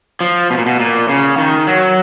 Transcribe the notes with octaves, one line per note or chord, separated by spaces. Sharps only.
F3
B2
A#2
B2
A#2
C#3
D#3
F#3